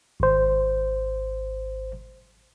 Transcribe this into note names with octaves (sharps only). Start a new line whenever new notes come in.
G#1 C5